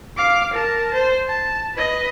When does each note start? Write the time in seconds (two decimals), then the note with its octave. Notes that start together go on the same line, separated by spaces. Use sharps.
0.17 F5 D6
0.53 A#4 A5
0.94 C5
1.27 A5
1.75 B4 D#5